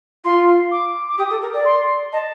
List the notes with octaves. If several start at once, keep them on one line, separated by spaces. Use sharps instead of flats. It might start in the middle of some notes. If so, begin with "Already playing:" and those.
F4 C6
D6
D6
G4 D#6
A4
A#4
D5
C6
D#5 A5